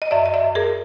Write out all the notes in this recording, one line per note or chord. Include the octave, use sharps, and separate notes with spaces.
D#5
F#2 D5 E5
F#2 D#5
D5 E5
F#2
G#4 A#4